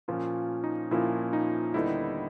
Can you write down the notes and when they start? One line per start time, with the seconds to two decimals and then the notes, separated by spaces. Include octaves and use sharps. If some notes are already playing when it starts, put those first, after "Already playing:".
0.08 A#2 F3 A#3 C#4 F4
0.64 D#4
0.91 A#2 F3 A#3 C#4 E4 F4
1.33 D#4
1.74 D#2 D3 G3 B3 D#4 E4